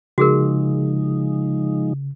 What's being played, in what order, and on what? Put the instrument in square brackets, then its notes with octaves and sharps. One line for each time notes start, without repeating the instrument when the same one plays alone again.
[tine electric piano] C#3 [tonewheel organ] F3 G#3 D#4 [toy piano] F#4 G#4 A#4